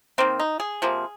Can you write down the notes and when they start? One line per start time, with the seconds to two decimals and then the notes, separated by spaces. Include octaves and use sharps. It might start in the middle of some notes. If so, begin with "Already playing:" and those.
0.18 D#3 A#3 C4
0.39 D#4
0.60 G#4
0.82 C3 F3 A#3